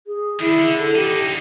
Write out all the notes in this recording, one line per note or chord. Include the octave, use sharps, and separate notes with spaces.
G#4
D#3 D4 E4
D3
A4
D3 D#4 G4